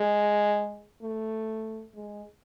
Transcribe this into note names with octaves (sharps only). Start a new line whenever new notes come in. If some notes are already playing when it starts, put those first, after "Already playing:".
Already playing: G#3
A3
G#3